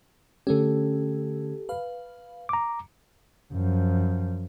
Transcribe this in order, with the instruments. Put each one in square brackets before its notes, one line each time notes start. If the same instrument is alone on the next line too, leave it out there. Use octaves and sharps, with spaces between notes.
[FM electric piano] D3 A3 C#4 [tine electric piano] G4 A4
[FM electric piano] B4 F5
[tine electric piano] A#5 D6
[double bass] F#2 F3